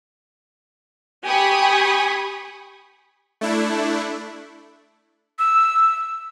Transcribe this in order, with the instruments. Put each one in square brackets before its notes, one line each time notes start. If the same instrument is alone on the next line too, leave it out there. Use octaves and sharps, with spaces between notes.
[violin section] G4 G#5 B5 C#6 D#6
[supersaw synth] A3 D4 E4
[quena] E6